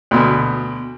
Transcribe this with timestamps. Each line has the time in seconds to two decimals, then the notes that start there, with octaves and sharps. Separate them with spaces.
0.11 D2 B2